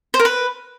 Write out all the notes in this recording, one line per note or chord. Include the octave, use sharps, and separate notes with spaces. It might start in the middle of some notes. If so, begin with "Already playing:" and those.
C5
A#4
B4